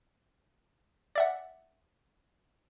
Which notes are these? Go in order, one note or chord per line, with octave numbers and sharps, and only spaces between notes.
D5 E5 F#5